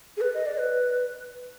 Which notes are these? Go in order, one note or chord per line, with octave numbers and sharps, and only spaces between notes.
G#4
B4
D#5
D5
B4